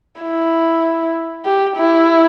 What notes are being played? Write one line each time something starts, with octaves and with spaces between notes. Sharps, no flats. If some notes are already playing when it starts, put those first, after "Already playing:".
E4
G4
E4